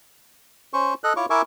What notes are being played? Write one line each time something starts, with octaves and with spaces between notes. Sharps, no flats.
C#4 C5 C#6
A4 D#5 F#6
E4 F4 C#5 C#6 D6
E4 A#4 E5 G#5 C#6 D6